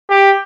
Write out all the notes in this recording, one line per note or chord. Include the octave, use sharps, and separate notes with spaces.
G4